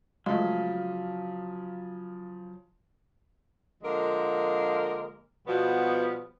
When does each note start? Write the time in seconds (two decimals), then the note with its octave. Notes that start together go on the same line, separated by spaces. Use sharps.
0.26 C#3 F3 F#3 G#3 A3 F5
3.83 D3 F3 G#3 A#3 A#4
5.47 B2 F3 G3 B3 F#4